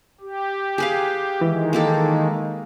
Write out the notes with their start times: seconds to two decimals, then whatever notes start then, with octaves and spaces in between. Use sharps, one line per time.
0.21 G4
0.78 G#4 B4 F5
1.41 D#3 E3 G#3
1.73 A#3 G4 A4